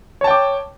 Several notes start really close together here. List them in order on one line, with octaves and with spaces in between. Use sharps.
C#5 A5 G5 D6